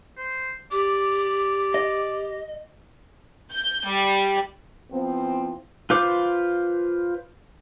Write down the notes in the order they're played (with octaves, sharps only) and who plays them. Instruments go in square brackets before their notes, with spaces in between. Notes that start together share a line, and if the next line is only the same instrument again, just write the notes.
[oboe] C5
[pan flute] G4 [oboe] D5
[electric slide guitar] D#5
[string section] G6
G3
[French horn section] E3 F3 B3 C4
[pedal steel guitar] F4 B4 C5 D6